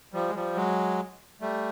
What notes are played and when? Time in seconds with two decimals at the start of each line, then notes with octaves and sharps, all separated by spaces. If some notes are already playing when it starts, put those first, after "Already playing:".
0.13 F3 G3
0.29 G#3
0.35 F3 G3
0.56 F#3 G#3
1.41 G3 A3